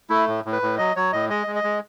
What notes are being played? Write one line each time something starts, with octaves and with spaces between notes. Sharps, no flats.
A3 E4
A2
A2
B4
A2
F#3 D#5
F#3 C#5
A2 D#5
G#3 D#5
G#3
D#5
G#3